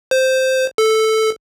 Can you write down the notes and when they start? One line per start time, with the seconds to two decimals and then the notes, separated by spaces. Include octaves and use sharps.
0.11 C5
0.78 A4